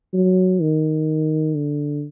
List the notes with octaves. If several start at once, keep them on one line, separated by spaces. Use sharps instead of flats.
F#3
D#3
D3